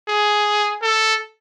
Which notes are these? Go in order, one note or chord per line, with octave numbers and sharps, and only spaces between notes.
G#4
A4